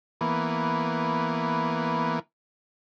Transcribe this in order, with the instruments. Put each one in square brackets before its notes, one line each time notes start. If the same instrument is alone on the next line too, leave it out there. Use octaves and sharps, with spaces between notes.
[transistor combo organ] E3 A#3 B3